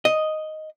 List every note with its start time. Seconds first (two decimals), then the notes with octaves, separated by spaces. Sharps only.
0.05 D#5